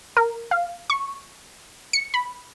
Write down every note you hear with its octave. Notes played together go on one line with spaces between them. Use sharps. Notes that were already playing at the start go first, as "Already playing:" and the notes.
A#4
F5
C#6
C#7
B5